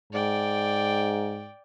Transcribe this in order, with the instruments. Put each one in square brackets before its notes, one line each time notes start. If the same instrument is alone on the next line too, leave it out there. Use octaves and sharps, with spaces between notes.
[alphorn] G#2 [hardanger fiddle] D5 G5